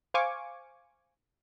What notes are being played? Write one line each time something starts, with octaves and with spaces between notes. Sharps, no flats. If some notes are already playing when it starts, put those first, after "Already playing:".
C5 F5 G#5 C#6 D6